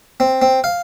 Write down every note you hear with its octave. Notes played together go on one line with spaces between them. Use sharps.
C4
C4
F5